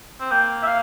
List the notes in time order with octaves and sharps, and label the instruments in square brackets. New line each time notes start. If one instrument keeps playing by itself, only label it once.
[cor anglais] C4
[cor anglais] A#3 [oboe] G5
[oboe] E5
F5